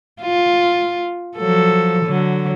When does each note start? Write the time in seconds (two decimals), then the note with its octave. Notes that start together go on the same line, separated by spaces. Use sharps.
0.21 F4
1.37 F3 F#3 A4
2.06 D3 F#3